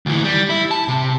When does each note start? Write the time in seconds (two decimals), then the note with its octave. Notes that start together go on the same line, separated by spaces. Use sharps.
0.06 D2 E3
0.24 G3
0.50 E4
0.71 A5
0.88 C3